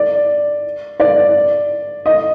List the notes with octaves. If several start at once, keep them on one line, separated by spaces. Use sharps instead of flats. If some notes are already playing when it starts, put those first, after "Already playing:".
Already playing: D5
D5
D#5